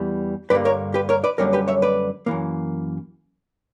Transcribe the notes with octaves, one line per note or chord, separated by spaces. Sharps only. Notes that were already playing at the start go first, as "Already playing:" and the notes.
Already playing: E2 E3 G3
G2 D3 G3 A#3 B4 D5
A#4 C#5
G4 B4
A#4 C#5
B4 D5
F#2 D3 G3 A#3 A#4 C#5
G4 B4
C#5 E5
B4 D5
F#2 E3 A#3